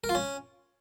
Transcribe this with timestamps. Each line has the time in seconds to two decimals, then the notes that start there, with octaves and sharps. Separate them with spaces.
0.04 A#4
0.09 F4
0.15 C#4